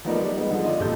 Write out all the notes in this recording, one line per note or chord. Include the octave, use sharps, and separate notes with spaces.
F3 A3 B3 D#4 A#4 D5
G3 D5
G#3 B3 D#4
D3 F3
F4 D5 D#5
G#1 A#2 G4 A4 G6